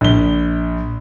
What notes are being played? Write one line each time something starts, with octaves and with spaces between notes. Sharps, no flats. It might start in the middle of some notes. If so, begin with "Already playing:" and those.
A#1 G7